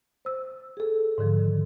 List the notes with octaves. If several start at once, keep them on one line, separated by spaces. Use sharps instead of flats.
C5 E6
G#4 A4
G#2 D3 D#3 F3